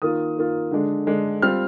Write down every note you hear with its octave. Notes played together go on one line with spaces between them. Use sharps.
D#3 A#3 F4 D#6
D#3 A#3 F4
D3 G#3 D4
D3 G#3 D4
G3 C4 F4 F6